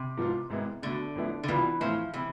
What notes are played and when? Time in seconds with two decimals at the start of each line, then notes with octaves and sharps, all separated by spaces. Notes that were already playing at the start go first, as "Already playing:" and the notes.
Already playing: C3
0.17 G#2 F3 B3 F4
0.50 G#1 G#2 G#3 B3 E4
0.82 B2 D3 A3 D4
1.15 A1 A2 F3 B3 E4
1.43 D3
1.48 C2 B2 E3 B3 F4
1.80 A2 E3 F3 A3 C4
2.14 C3 E3